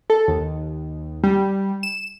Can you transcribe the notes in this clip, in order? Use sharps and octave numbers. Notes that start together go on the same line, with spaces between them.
A4
D#2
G3
E7